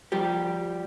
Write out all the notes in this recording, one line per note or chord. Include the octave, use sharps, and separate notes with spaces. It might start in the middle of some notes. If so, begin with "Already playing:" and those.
F3 G3 G4